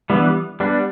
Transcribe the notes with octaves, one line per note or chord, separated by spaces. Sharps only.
E3 G3 B3 D4
G3 B3 D4